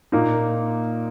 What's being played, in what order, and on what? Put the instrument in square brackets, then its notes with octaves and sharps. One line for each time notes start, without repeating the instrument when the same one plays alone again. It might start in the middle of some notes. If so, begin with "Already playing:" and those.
[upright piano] A#2 A#3 D#4